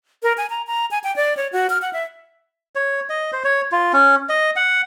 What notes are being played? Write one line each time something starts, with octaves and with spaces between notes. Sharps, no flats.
A#4
G#5
A#5
A#5
G#5
G5
D5
C#5
F#4
F6
F#5
E5
C#5
D#5
C5
C#5
F4
C#4
D#5
F#5